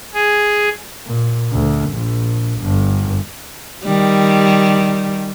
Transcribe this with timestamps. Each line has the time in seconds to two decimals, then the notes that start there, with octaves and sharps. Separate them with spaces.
0.13 G#4
1.06 A#2
1.51 D2
1.90 A#1
2.60 G1
3.84 D#3 G3